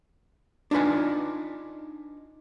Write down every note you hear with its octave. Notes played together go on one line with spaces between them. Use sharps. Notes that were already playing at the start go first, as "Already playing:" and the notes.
D4 D#4 F4 B4 G#5